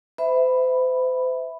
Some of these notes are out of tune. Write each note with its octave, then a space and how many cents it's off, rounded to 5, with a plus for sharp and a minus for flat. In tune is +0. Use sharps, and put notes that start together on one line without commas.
C5 -40 E5 -5 B5 +0